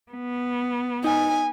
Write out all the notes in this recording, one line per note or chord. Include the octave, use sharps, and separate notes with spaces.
B3
D#4 G#5